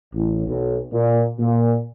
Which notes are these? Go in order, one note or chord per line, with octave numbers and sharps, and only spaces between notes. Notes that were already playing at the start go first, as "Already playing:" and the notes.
A1
B1
A#2
A#2